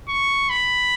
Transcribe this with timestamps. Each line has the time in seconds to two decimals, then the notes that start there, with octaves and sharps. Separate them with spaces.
0.09 C#6
0.49 B5